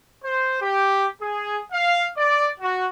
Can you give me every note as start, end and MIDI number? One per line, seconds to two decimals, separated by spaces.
0.23 0.58 72
0.61 1.07 67
1.21 1.58 68
1.72 2.05 77
2.17 2.49 74
2.60 2.86 66